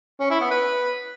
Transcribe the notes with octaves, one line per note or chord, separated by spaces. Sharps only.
C#4
E4
B3
B4